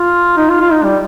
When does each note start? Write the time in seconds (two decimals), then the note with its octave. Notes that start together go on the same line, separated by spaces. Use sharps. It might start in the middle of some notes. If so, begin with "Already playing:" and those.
Already playing: F4
0.37 D#4
0.49 F4
0.60 F4
0.72 D#4
0.83 G3